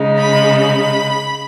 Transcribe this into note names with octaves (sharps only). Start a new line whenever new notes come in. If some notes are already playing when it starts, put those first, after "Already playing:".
Already playing: C#3 G#3 D#4
B5
B5